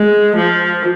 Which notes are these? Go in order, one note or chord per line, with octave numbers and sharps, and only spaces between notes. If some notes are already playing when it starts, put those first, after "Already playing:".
Already playing: G#3
F3